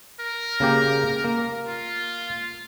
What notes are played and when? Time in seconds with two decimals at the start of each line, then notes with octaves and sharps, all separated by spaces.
0.20 A#4
0.60 C#3 A#3 G4
1.24 A#3
1.67 F4